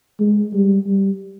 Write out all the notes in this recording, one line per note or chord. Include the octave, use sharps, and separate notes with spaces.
G#3
G3
G3